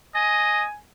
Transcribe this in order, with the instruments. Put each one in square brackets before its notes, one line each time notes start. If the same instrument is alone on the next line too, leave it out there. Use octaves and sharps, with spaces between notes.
[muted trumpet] D#5 [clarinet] G#5